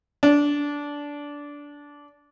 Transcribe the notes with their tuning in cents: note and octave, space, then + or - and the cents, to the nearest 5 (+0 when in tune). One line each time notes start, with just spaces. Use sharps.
D4 -15